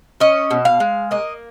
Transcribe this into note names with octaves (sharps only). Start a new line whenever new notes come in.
C#4 D#5
B2
F5
G#3
A#3 D#5